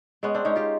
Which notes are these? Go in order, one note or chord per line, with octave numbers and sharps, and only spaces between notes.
G#3 B3 C#4
C4 D4
G#3 C#4 D#4
F4 G4